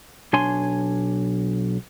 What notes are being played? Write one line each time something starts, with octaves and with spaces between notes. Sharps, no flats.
B1 D4 C#5 G#5 C6